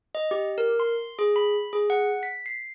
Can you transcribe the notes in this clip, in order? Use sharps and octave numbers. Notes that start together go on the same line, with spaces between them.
D#5
G4
A#4
C6
G#4
B5
G#4
F#5
B6
C7